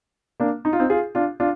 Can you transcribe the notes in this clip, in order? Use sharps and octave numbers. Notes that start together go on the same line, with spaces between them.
A#3 D4
D#4
F4
C4 D#4
F4 G#4
D4 F4
D4 F4